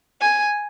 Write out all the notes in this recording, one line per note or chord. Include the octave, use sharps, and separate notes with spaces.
G#5